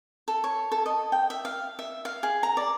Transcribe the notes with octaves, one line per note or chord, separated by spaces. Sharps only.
A4
C#5
A4
D#5
G5
E5
F5
E5
F5
G#4
A#5
D5